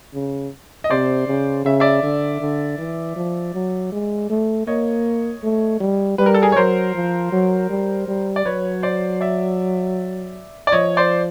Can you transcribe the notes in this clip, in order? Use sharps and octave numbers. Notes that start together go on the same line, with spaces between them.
C#3
D#5
C3 C5 D5
C#3
C#3 E5
D5 E5
D3
D3
E3
F3
F#3
G#3
A3
A#3 C#5 D#5
A3
G3
G3 B4
A#4
A4
G#4 A#4
C#5
F#3 A#4 C5
F3
F#3
G3
G3
D5
F#3 B4 C#5
C5 D5
D5 E5
D5
F3 C#5 D#5
C5 D5